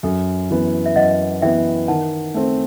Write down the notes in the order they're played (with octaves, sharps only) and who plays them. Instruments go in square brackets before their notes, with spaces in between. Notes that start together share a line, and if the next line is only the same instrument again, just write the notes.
[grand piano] F#2 [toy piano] A4
[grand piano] E3 B3
[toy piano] E5
[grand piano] F#2 [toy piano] D#5 F#5
[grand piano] E3 B3 [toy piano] E5 G5
[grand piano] D#3 [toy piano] F#5 A5
[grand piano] A3 C4